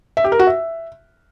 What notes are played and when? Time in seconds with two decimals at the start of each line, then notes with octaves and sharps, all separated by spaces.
0.17 E5
0.24 G4
0.32 A#4
0.39 F#4
0.47 E5